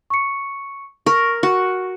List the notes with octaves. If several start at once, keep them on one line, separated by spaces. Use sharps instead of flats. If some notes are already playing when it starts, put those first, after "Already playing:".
C#6 C#7
A#4 C#6
F#4 C#6